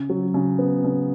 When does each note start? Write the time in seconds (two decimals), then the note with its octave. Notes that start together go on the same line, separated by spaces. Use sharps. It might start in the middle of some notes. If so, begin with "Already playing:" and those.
Already playing: C#3
0.10 F#3
0.34 C#3
0.59 B3
0.84 C#3